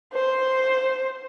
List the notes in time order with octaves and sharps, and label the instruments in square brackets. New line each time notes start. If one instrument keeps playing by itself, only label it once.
[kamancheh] C5